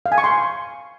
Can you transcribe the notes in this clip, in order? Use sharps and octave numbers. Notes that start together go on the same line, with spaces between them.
F5
G#5
C#6
C6